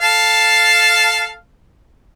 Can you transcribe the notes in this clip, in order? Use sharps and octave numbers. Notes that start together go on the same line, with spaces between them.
A4 F5 A5